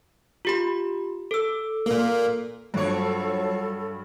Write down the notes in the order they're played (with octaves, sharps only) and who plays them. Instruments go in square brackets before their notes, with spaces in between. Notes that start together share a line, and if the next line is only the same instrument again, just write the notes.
[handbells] F4 G4 B5
A4 E6
[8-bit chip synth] A#2 A#3
[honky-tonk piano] G2 [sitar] F3 C#5 [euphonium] F#3 [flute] A4